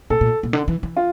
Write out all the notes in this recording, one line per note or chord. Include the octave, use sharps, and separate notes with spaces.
A#2 A4
A#2
A#2
D3
E3
E3
F4